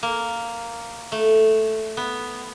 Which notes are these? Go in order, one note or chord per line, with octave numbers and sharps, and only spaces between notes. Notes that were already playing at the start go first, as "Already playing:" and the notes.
A#3
A3
B3